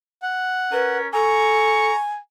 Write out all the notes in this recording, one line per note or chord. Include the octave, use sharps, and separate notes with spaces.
F#5
C#4 A#4 B4
A4 G#5 A#5 C#6